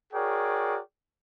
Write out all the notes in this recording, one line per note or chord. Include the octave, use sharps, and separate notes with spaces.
F#4 G#4 A#4 C#5 D5 G5